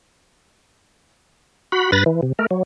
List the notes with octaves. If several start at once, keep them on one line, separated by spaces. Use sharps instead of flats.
F#4 B5
G2 B4 B5 A6 A#6
E3
C3
A3 A#4
F#3